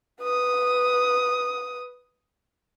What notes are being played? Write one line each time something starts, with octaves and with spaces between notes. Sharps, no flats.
B4 D#6